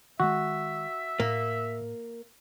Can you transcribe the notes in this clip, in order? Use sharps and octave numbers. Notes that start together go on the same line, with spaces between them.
D#3 G#3 F#4 E5
A2 A#3